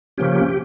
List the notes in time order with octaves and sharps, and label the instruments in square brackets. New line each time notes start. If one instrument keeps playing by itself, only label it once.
[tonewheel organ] C#3 F3 A#3 C#4 G4